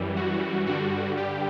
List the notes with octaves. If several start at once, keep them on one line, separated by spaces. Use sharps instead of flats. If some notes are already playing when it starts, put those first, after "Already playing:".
Already playing: F#2 E3 G3
F#4
G2 D3 G3 F#4
G4